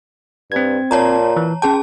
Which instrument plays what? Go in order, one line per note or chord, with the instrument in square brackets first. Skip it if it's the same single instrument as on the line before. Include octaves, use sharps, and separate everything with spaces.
[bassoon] G2 [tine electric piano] C4 G#6
[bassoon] A#2 [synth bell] C#5 A5 A#5
[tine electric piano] E3
[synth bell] C#4 G#4 A5 [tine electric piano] G5